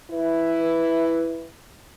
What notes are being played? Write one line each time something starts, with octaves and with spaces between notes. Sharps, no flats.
E4 B4